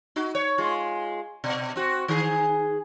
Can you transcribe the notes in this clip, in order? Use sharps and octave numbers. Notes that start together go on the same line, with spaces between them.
D#4 F#4
C#5
G#3 F4
B2
C4 F#4
D#3 G#4